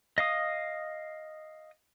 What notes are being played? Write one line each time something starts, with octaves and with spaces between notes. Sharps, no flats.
D#5 F5 D#6